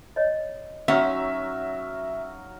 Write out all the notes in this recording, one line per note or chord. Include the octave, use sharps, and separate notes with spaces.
C#5 D#5
F#3 C#4 D#4 F#4 E5 F5